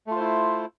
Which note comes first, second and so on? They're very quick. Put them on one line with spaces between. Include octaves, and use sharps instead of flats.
A3 F4 C5 E4